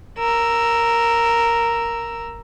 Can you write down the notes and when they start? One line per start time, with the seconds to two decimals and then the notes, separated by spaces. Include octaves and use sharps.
0.18 A#4 E6